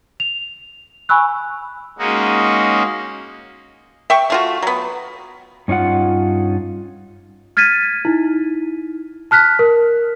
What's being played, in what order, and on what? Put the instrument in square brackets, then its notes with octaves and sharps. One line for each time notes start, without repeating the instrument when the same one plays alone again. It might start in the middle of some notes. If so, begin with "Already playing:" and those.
[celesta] F7
G#5 B5 C#6 E6 F#6
[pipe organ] G#3 A#3 C#4 D#4 F#4
[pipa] E5 G5 C#6
A3 F4 F#4
F#3 B3
[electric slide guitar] G2 C#4 D#4 F4 F#5
[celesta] F6 G#6 A6 B6 D#7
D#4 E4
A5 F6 F#6 B6
A#4